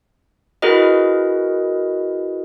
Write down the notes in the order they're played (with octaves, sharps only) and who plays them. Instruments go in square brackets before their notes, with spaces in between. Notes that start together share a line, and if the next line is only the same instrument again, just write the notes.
[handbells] E4 F#4 G#4 A#4 B4 D#5